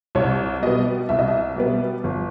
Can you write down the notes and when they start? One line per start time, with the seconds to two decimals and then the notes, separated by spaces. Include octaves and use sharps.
0.15 C2 C#5
0.62 B2 G3 B3 D#5
1.09 C2 E5
1.19 D#5
1.28 E5
1.56 B2 G3 B3
2.04 G1